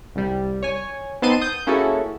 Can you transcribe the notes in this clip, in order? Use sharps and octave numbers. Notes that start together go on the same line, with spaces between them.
C2 G3
C#5 G#5
B3 C4 D#4 A5 C6 D#7
D#6 G6
A#3 C#4 E4 F#4 G#4 A4